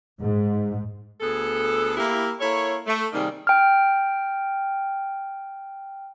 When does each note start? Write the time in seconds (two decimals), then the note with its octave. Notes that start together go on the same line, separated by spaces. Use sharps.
0.19 G#2
1.21 D2 B3 G#4 A4
1.97 A#3 E4 G4
2.40 A#3 E4 A4 C#5
2.87 A3
3.13 C3 D#3 G3 A#3 D#4 G#4
3.47 G5 F6